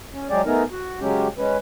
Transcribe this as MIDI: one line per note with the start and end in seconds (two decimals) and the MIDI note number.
0.13 0.28 61
0.30 0.42 54
0.30 0.42 56
0.30 0.42 67
0.30 0.42 68
0.30 0.42 74
0.46 0.63 57
0.46 0.63 59
0.46 0.63 63
0.46 0.63 68
0.46 0.63 70
0.71 1.00 66
1.00 1.28 49
1.00 1.28 54
1.00 1.28 56
1.00 1.28 61
1.00 1.28 67
1.38 1.57 56
1.38 1.57 61
1.38 1.57 71